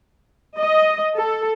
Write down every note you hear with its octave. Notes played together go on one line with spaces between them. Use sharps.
D#5
A4